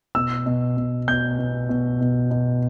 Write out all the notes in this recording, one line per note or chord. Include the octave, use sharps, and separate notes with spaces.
B2 E6
B2
B2
B2 G6
B2
B2
B2
B2